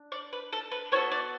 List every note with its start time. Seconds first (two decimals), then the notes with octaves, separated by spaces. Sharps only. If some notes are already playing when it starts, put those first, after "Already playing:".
Already playing: D4
0.12 D5
0.33 B4
0.53 A4
0.72 B4
0.92 B3 F#4 A4 C#5
1.12 D5